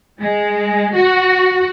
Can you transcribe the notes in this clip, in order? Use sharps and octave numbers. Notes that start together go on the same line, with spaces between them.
G#3
F#4